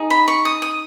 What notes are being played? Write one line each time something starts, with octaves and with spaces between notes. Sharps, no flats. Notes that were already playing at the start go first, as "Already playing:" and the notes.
Already playing: D#4 G#4
B5
C#6
D#6
D#6